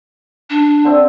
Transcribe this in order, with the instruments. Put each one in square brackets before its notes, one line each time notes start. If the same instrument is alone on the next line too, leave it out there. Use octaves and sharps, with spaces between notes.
[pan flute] D4
[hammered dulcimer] D3 C4 E5